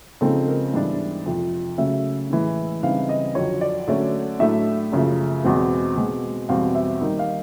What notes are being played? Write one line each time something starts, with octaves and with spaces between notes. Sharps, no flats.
C#3 F3 G#3 C4 D#4 A4
A#4
G#2 E3 G3 B3 D4
F2 C3 F3
C#3 F#3 A3 C#4 E5
A2 E3 G#3
C#3 E3 G3 C4 D#4 F5
D#5
F2 D3 F#3 C#5
D5
D3 F#3 A3 C#4
A2 F#3 A3 D4 E5
F#2 C#3 F3 A3
E2 B2 G#3 C4
B2 G#3 C4
E2 B2 G3 C4 F5
E5
D#3 G3 A#3 D#4
F5